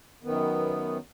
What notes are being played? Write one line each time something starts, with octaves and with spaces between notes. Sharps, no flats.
F#2 D#3 B3